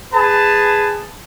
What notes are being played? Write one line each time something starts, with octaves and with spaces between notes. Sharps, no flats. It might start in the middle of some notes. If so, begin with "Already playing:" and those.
G#4 B4 A5